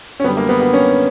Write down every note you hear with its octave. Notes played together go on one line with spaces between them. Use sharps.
C#4
F#2 D3 G3 B3
A#3
B3
B3
C#4